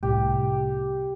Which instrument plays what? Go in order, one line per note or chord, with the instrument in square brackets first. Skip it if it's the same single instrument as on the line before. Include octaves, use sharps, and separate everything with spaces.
[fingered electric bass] C2 A2 [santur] G4